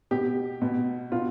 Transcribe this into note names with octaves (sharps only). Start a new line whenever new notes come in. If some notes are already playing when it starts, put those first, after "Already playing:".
B2 G4
B2
B2 F4